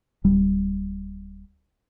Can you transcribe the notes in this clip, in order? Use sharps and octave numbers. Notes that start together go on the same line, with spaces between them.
D1 G3